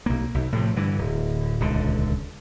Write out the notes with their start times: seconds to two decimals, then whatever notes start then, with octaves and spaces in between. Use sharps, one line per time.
0.06 B1 A#3
0.34 B1
0.52 A2 C3 F3
0.76 G2 D3 E3
0.98 D1
1.60 D#1 C#2 D3